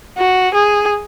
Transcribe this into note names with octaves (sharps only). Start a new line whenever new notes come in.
F#4
G#4